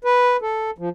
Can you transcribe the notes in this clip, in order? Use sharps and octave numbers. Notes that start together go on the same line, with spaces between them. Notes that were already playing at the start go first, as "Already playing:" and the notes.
B4
A4
F3